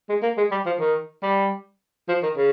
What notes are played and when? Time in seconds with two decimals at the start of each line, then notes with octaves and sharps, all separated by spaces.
0.09 G#3
0.22 A#3
0.37 G#3
0.51 G3
0.66 F3
0.80 D#3
1.23 G3
2.08 F3
2.23 D#3
2.37 C#3